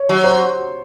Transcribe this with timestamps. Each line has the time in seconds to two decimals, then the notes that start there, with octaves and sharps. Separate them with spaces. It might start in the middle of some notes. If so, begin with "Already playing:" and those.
Already playing: C#5
0.09 F#3
0.24 C5